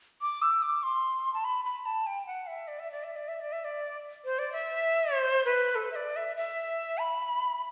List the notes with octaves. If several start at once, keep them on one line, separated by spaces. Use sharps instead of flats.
D6
E6
D6
C6
A5
B5
B5
A5
G5
F#5
E5
D5
E5
D5
E5
D5
E5
D5
E5
D5
C5
D5
E5
C5
B4
A4
E5
D5
E5
E5
B5